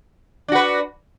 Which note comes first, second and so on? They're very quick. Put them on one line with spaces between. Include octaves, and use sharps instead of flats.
D4 F#4 B4